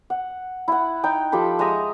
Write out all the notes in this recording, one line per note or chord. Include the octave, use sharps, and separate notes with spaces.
F#5
E4 F#5
D#4 G5
F3 G4 A4 B5
G#3 E5 A#5 D#6